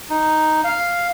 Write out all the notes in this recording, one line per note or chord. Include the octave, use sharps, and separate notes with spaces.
D#4
F5